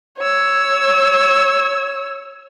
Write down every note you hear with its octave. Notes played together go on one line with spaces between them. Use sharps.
C#5 E6